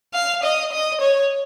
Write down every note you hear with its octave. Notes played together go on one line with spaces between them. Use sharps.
F5
D#5
D#5
C#5